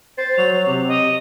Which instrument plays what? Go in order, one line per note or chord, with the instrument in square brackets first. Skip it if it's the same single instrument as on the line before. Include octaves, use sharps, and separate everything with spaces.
[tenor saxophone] C5 [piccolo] A6
[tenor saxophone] F#3 [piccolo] F7
[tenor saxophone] C3
[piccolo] D#5